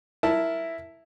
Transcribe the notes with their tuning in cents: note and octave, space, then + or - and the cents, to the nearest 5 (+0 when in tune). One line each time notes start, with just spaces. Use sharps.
E4 +0 A#4 -5 A5 +0